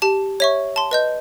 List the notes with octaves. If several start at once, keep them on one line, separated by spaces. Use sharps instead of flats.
G4 A5
C#5 E5 C#6
A5 C6
B4 D#5 G6